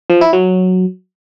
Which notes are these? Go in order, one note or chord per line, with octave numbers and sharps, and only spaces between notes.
F3
E4
F#3